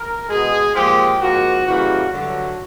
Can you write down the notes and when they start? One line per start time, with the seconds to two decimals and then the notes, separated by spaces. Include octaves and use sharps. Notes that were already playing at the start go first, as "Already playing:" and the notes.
Already playing: A#4
0.28 B2 G#3 G#4
0.74 A#2 F3 G#3 G4
1.20 G#2 F3 A#3 F#4
1.66 C#3 E3 G3 A#3 F#4
2.12 G2 D3 F#3 A3 F#4